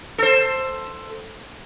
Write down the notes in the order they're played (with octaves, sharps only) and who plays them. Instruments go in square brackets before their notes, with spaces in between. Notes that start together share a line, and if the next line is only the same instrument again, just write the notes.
[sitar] A4 C5